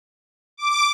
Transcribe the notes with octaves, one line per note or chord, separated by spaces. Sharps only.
D6